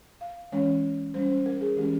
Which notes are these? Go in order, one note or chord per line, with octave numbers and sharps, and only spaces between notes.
F5
E3 G#3 C#4 C#5
G3 C#4 C5
C5
A#4
G#4
E3 G#3 C#4 G4